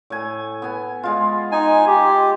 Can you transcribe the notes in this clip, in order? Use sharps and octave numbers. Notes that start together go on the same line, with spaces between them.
A2 G#5
B3 G#5
G#3 F4
D#4 G#5
G4